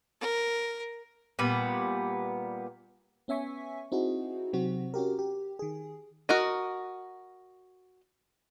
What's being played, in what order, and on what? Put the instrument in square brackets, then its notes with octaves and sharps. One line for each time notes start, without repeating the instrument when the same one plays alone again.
[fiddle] A#4
[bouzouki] A#2 G3 B3
[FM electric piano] B3 C#4 E5 G#5 C#6 B6
C4 D#4 E4 F#4 G#4
C3 F#3 C4 F#4
C#4 F#4 G4 A#4
G4
D#3 G#4
[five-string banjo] F#4 A#4 D#5